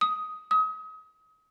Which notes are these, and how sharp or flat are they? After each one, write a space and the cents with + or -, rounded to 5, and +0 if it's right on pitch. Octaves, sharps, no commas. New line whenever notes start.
D#6 +10
D#6 +35